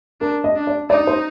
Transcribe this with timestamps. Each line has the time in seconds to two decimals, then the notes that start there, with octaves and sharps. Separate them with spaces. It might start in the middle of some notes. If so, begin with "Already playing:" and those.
0.21 D4 A#4
0.44 D#5
0.56 D4
0.67 D5
0.90 D#4 D5
1.07 C5